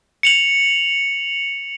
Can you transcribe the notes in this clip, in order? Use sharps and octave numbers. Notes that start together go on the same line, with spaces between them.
C#7 F7 F#7